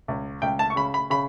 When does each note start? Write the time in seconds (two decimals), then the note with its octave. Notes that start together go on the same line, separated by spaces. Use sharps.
0.08 C#2
0.42 C#2 G5
0.59 A5
0.70 C#6
0.76 C#3 B5
0.94 B5
1.10 C#3 B5